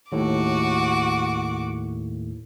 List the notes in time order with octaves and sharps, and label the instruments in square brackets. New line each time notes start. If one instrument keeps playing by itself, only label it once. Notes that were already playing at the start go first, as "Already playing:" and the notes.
[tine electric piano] D#2 A2 [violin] F#4 D6